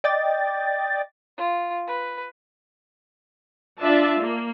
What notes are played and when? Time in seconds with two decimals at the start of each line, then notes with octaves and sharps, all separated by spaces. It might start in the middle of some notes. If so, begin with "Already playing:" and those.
0.04 D5 D#5 G5 A6
1.38 F4
1.87 B4
3.81 D4 F4 D5 E5 A5
4.19 A#3